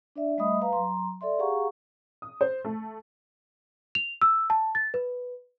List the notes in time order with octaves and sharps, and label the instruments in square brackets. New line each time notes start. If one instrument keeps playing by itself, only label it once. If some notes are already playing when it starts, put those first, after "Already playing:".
[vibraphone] D4 D5 E5
G3 A3 D#5 E5 B5 D#6
B4 F5 A#5
F#3 A#5 C6
A4 D5 E5 C6
G4 G#4 F5 F#5 A#5 C#6
[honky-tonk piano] D#6
C5
A3
[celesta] F7
E6
A5
A6
B4